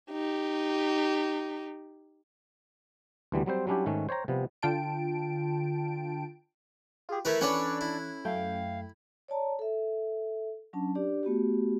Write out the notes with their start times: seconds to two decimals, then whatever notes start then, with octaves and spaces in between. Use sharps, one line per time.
0.11 D#4 G4
3.32 D2 E3 G3 B3
3.46 F#3 G3 C4 C5
3.67 F#3 G3 C#4 D4 E4 G4
3.86 G#2 D#3 A3 C#4
4.09 C5 C#5 G5 A#5
4.28 C3 F3 G3 B3
4.62 D3 F4 G5 A5 D7
7.09 F4 G4 G#4
7.25 E3 A3 A#4 B4 E5 F#6 G#6
7.41 C#4 D4 A4 B4 C#5 D5 B5
7.81 E4
8.25 F#2 A3 F5 G5
9.28 C#5 D5 A5 A#5
9.59 A4 E5
10.73 F#3 C#4 D4 A5
10.95 D4 G4 D5
11.23 A3 B3 F#4 G4